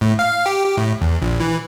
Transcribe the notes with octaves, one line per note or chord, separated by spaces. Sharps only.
A2
F5
G4
G4
A2
E2
A#1
E3